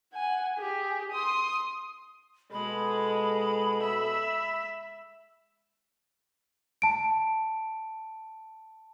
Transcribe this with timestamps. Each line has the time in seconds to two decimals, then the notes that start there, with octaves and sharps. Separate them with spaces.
0.13 F#5 G#5
0.56 G4 G#4
1.11 C6 D#6
2.52 B2 G#3 A4 B5
3.82 E5
6.82 A5 D7